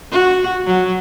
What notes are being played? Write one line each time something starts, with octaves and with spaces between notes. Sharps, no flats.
F#4
F#3